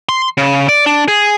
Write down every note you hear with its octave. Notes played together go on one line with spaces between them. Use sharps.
C6
C#3
D5
D4
G#4